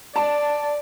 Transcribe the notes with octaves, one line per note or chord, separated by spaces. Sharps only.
D5 A5